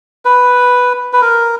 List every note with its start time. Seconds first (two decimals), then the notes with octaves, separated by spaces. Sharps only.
0.25 B4
1.13 B4
1.22 A#4